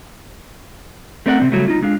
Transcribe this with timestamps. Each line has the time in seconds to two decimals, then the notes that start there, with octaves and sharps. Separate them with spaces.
1.26 A3 C4 A#4 D5 F5 F#5
1.40 C3 D#3 C4
1.52 C#3 F#3 G3 A3
1.68 D#4 F4
1.82 G#3 D4 F5